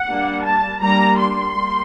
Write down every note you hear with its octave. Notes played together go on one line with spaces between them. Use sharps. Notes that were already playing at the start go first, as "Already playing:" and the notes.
Already playing: F#5
G3 A#3 D4
A5
G3 A#3 D4 A#5
C6
G3 A#3